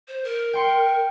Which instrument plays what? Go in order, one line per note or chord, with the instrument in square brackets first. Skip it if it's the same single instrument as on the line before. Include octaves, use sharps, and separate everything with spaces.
[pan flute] C5
A#4
[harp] G5 C6 C#7